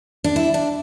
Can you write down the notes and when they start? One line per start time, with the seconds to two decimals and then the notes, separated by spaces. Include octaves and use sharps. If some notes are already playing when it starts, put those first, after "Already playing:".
0.24 D4
0.36 E4
0.54 D4